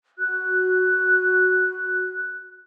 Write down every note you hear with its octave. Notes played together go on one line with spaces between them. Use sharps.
F#4 F#6